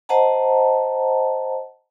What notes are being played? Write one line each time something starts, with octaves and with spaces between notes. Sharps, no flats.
C5 D#5 F#5 A5 A#5